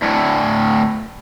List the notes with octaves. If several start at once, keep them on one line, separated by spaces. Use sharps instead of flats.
D2 A2